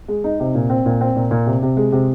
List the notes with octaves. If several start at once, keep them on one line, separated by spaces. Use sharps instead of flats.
G#3
D#4
C3
A#2
C4
A#2
C4
A#2
A#2
C3
C3
G#3
C3